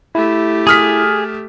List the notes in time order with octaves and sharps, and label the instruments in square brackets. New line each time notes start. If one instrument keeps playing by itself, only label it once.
[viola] A3 G4 [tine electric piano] E4
[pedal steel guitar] G#4 [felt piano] D#6 F6 B6